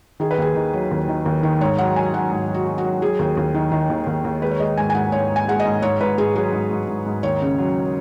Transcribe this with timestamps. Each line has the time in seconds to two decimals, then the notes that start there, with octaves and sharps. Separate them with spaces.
0.20 D#3 G#4
0.31 B4
0.38 D#2 G#4
0.55 D#3
0.73 F#3
0.91 D#2
1.08 D#3
1.26 D#2
1.43 D#3
1.60 G#2 C#5
1.78 F#3 F#5
1.96 F#3 G#5
2.13 F#3 F#5
2.31 G#2
2.49 F#3
2.54 F#4
2.66 F#3
2.78 F#4
2.84 F#3
3.02 F#3 G#4
3.19 D#2
3.37 D#2
3.54 D#3
3.72 D#3
3.90 D#2
4.07 D#2
4.24 D#2
4.42 G#3 B4
4.51 C#5
4.60 G#3 D#5
4.77 G#2 G#5
4.90 G#5
4.95 G#2 F#5
5.12 G#2 C#5
5.30 G#2
5.36 G#5
5.48 G#3 F#5
5.60 D#5
5.65 G#2
5.82 G#2 C#5
6.00 G#2 B4
6.18 G#2 G#4
6.35 F#3 G#4
6.53 G#2
6.71 G#2
6.88 G#2
7.06 G#2
7.23 D#2 C#5
7.42 C#3
7.58 F#3